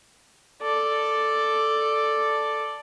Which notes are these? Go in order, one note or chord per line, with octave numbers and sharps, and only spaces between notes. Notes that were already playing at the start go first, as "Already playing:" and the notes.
A4 D5